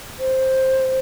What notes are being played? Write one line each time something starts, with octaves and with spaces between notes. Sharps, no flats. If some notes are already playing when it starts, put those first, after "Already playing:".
C5